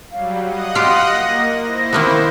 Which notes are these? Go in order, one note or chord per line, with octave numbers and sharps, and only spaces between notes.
F#3 G3 F5
D#5 F#5 D#6
F4 G4
A#3 A#6
E4 C5
D#3 A#3 B3